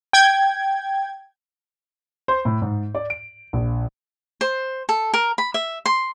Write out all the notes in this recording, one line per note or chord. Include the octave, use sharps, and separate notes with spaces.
G5 G#6
C5
A2
G#2
D5
D7
A#1
C5
A4
A#4
B5
E5
C6